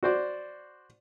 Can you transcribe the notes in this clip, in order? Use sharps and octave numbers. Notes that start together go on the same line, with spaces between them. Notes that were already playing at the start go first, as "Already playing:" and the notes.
F#4 C5 D5